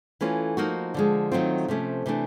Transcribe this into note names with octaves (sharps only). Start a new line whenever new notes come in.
E3 A3 C#4 F4
F3 A#3 D#4 F#4
D3 F3 G#3
D#3 F#3 A3 C4 F4
C3 F3 A3 C#4
C3 E3 A3 D4